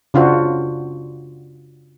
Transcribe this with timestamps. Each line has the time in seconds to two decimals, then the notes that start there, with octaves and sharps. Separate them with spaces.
0.14 C#3 D4 F4 F#4 C5